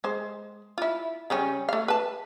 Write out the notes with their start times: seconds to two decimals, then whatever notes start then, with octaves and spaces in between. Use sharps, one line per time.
0.04 G#3 C5
0.78 E4 F4
1.30 C#3 G3 C#4
1.69 A3 F5
1.88 B4 A5